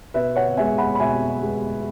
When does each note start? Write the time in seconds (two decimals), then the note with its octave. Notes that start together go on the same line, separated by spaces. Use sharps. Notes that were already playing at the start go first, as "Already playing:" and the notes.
0.14 B2 B4 E5
0.36 C#5 F#5
0.57 G#3 B3 E5 G#5
0.78 F#5 B5
0.95 B5
1.00 B2 E5 G#5
1.42 G#3 B3